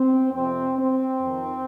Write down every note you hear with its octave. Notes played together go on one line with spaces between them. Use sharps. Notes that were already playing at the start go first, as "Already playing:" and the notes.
Already playing: C4
F2 C3 F3 C4
C4
F2 D#3